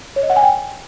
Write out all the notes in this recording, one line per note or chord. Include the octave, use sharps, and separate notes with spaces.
C#5
D#5
F#5
G#5
G5